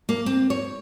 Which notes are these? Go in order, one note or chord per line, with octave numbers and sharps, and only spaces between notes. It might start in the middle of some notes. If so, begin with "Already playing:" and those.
A#3
C4
C#5